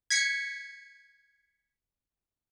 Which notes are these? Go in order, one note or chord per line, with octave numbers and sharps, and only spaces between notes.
G#6 B6 C#7